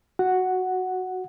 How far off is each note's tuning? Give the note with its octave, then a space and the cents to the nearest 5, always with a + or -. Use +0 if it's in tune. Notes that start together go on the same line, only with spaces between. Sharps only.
F#4 +0 F#5 +0